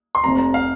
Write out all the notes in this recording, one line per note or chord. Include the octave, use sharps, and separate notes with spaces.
C6
F1 F2 C3 A#5
A#5
F5